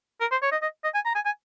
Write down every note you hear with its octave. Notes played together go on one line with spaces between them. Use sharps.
A#4
C5
C#5
D#5
D#5
D#5
G#5
A#5
G#5
G#5